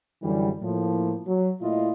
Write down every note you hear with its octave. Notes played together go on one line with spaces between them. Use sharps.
F#2 D3 E3 G3
A2 F3 A#3
F#3
A#2 A3 E4 F4 D#5